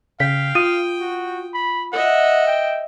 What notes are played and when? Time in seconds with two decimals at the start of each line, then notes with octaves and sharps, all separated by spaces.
0.20 C#3 F5 G5 B6
0.55 F4 D#6 D#7
1.00 F#4
1.54 B5
1.93 D#5 E5 F#5
2.47 G5